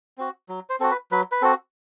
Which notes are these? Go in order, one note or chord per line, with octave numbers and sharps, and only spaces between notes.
C4 F#4
F#3
C5
C4 F#4 A4
B4
F#3 B4
B4
C4 F#4 A4